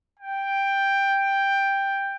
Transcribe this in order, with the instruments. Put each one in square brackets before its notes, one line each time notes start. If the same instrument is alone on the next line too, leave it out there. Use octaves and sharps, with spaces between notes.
[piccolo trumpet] G5